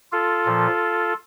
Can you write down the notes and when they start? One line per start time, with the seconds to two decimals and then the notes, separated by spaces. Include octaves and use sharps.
0.12 F4 A4
0.46 A#2 F3